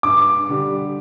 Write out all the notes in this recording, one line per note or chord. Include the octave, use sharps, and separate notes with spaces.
G2 D6
D3 G3 D4 G4